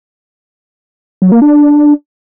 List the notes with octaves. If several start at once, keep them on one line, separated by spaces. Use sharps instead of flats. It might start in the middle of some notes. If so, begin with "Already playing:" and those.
F#3
A#3
D4